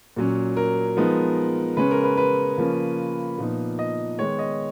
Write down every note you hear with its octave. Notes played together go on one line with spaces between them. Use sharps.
A#2 F#3 C#4
A#4
F3 G#3 B3 D#4
C#3 G#3 C#4 B4
A#4
B4
B4
C#3 F3 A#3 C#4
A#2 F3 B3 D#4
D#5
D#3 G#3 B3 C#5
D#5